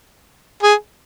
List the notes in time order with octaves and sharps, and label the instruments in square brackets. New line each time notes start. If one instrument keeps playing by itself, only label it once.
[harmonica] G#4